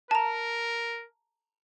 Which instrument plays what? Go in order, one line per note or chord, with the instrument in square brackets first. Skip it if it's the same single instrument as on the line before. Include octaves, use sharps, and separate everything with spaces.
[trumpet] A#4 [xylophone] A5 A#5